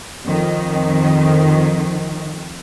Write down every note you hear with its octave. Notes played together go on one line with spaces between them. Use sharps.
F2 D#3